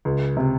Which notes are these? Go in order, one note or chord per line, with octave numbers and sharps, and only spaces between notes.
C#2
C3